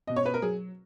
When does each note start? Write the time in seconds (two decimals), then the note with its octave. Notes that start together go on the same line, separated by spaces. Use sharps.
0.07 B2 D#5
0.16 C#5
0.26 B4
0.34 A#4
0.42 F#3 G#4